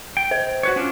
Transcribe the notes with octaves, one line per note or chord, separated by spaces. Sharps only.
G5
C5
F#4 B4 C#5
C#4 D4 F4